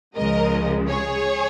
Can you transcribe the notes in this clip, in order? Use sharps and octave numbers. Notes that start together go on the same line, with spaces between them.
C#2 C#3 F3 G#3 A#4 D#5
G#4 C#5